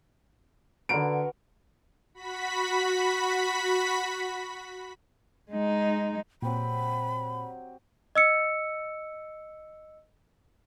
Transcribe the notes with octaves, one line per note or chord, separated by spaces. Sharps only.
D3 F#4 A#4 B4 D7
F#4 B5 B6
G#3 D#4
A#2 F#3 C4 G4 B5
D#5 E6 C#7